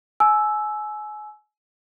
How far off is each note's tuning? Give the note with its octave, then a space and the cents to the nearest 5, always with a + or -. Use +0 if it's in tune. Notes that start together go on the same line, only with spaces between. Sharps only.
G#5 +30 E6 +0